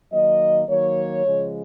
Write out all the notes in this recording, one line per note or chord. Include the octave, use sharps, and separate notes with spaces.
D#3 F#3 A#3 D#5
D#3 F#3 A#3 C#5
C#3 F3 G#3